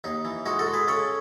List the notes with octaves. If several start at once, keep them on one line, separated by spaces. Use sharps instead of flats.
D#2 D#4
E3
G#3 D#4 F#4
F#4 A4
G#3
G#4 B4
C#3 A4 C#5